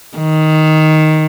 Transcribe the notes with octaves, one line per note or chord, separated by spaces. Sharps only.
D#3